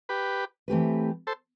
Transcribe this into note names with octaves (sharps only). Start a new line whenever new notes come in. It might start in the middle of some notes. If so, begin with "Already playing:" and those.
G4 B4
E3 A3 C4 G4 B4
A4 C5